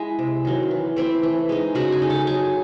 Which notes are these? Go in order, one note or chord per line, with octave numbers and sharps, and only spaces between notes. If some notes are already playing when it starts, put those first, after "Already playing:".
Already playing: G#3 E4 G#4
C3
D#3 F#3 C4
E3
A3 C4 E4
E3
G#3 D#4
C#3 F#4 F#5
G#4 G#5
G#3 D#4
A4 A5
F#3 G#4 G#5